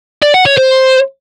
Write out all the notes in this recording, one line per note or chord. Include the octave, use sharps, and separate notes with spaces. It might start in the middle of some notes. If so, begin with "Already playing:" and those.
D5
F#5
C#5
C5